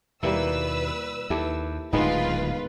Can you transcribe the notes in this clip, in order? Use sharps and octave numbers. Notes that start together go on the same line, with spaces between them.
D#2 B2 G3 A#3 E4 B4 E6
D#2 E4 G4 A4
D1 D2 G#2 D#3 G#3 B3 F4 B4